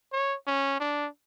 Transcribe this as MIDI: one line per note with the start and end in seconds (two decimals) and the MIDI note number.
0.13 0.35 73
0.47 0.77 61
0.80 1.07 62